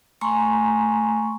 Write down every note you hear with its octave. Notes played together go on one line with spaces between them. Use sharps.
A3 G#5 A#5 C6 C#6